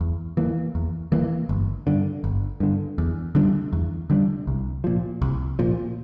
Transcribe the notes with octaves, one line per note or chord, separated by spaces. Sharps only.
E2
E3 A#3
E2
E3 A#3
G1
G2 D3
G1
G2 D3
E2
D3 G3 D4
E2
D3 G3 D4
C2
A#2 F3
C2
A#2 F3